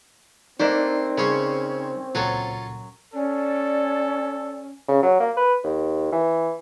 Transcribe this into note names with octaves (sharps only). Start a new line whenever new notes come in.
A3 A#3 C4 D4 D#4 C5 D5
C#3 C#4 C#5 C6
C#2 A#2 F#3 F4 A4 C#5
C#4 A4 D5
C#3
F#3
A#3
B4
D#2
E3